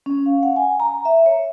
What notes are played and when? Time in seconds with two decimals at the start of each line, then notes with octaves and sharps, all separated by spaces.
0.06 C#4
0.26 F5
0.43 F#5
0.56 G#5
0.80 A#5
1.05 E5
1.26 C#5